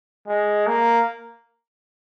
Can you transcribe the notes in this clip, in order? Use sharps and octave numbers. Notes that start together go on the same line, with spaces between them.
G#3
A#3